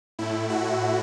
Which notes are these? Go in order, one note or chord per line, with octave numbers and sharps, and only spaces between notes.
A2 A3 E4
F#4